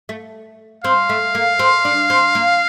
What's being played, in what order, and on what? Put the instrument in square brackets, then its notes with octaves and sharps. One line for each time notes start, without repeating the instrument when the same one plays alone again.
[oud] A3
[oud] C4 [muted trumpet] F5
[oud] A3
A#3
C4
D4
C4
A#3